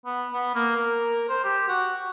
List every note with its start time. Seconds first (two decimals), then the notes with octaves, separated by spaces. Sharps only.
0.05 B3
0.33 B3
0.55 A#3
0.76 A#4
1.29 C5
1.44 G4
1.68 F#4